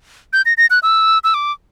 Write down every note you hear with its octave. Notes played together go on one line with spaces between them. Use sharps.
G6
A#6
A#6
F#6
E6
E6
D6